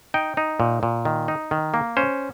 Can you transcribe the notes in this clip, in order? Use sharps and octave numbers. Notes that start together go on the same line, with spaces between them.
D#4 G5
D#4
A#2
A#2
D#3
D#4
D#3
A#3
C#4 C5